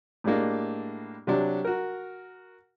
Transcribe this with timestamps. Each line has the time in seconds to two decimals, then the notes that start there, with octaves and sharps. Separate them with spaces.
0.24 A2 G3 G#3 A#3 D4
1.27 C3 F#3 D4
1.65 F#4 A#4